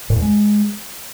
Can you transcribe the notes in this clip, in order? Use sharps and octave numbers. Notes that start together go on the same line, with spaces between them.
A2
E2
G#3